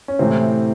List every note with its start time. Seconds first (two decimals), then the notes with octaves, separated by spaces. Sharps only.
0.08 C#4
0.19 A2 C3 E3 C4